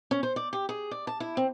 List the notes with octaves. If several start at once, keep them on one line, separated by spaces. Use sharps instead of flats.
C#4
C5
D5
G4
G#4
D5
A5
E4
C4